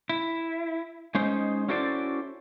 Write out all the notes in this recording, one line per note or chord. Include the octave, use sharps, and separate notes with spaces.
E4
G#3 C#4 D#4 C5
C#4 E4 F#4 A4 C5 D5